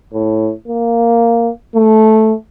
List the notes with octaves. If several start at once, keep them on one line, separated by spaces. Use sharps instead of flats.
A2
A#3
A3